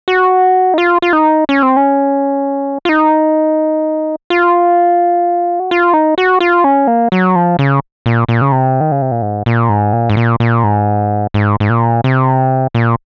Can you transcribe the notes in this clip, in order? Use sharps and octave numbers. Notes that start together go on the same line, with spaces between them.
F#4
D#4
F4
F4
D#4
C#4
C4
C#4
F4
D#4
F4
F#4
F4
D#4
F#4
F4
C#4
A#3
F#3
F3
C#3
A#2
A#2
C#3
C3
D#3
C#3
C3
A#2
G#2
A#2
G#2
A#2
G#2
A#2
A#2
G#2
G#2
G#2
A#2
C3
A#2